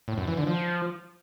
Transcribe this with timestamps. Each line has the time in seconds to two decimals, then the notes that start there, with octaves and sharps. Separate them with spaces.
0.08 A2
0.18 F#2
0.27 E3
0.37 D3
0.47 F3